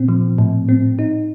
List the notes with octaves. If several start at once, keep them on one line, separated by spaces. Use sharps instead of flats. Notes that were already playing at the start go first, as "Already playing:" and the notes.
Already playing: A#2 C4
F3
A2
C4
D#4